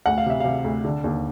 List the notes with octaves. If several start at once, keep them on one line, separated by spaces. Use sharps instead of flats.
D2 F#5
F5
C3 E5
C3 F5
D2
D3
D#2